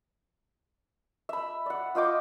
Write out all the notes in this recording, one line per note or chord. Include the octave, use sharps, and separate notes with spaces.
E5 B5
D5 F#5
F4 D#5 G5 D6